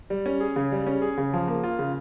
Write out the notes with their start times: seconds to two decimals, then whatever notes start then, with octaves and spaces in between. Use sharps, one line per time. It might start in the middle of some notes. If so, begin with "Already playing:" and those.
0.10 G3
0.26 C#4
0.41 G#4
0.56 C#3
0.72 G3
0.87 C#4
1.02 G#4
1.18 C#3
1.33 F3
1.48 A#3
1.64 F4
1.79 C#3